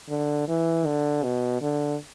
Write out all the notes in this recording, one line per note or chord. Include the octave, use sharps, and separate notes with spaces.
D3
E3
D3
B2
D3